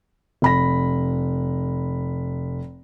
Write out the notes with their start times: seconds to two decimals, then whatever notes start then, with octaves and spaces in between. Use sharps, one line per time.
0.42 F1 B5 A#6